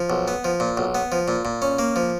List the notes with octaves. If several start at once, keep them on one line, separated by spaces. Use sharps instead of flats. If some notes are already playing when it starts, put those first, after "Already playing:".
Already playing: F3
B1
B3
F3
A#2
B1
B3
F3
A#2
A#2
C#4
A#3
F3